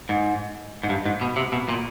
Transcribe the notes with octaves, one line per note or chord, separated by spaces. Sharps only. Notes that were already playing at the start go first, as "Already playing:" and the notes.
G#2
G#2
G2
G#2
B2
C3
B2
A#2